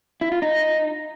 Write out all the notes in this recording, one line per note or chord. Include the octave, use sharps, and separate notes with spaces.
E4
F4
D#4